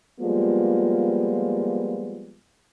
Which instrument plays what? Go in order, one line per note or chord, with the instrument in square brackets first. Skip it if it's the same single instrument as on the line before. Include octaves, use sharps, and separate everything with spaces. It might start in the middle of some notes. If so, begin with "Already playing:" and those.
[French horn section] F3 G3 G#3 A#3 B3 F4